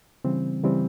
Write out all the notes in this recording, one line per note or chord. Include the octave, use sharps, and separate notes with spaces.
C#3 E3 G3 C4
C#3 E3 G3 C4